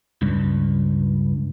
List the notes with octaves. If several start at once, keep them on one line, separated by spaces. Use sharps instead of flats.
C#2 G2